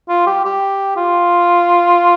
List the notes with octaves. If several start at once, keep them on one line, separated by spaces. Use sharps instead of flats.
F4
G4
G4
F4